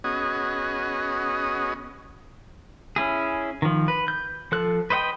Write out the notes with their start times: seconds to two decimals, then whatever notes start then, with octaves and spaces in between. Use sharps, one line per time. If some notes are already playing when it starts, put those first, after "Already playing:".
0.04 B3 C#4 F#4 G#4 D#5
2.96 C#4 E4 G#4
3.62 D#3 F3
3.88 B4
4.08 G6
4.52 F3 A4 F#6
4.90 B4 C5 D#5 F#5 G5